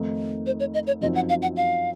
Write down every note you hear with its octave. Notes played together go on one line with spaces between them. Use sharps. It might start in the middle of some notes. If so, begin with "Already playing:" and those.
Already playing: F2 D#3 A3 D#4
C5
C#5
D#5
C#5
F#2 F3 C4 D#4 D#5
F#5
F5
F#5
F5